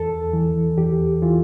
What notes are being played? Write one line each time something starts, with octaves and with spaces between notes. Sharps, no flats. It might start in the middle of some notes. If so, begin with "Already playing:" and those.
Already playing: E2 A4
E3
E2 G4
E3 F4